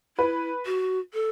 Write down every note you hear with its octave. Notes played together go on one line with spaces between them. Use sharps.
E4 B4
F#4
A4